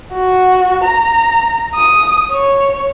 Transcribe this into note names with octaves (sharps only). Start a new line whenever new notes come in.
F#4
A#5
D#6
C#5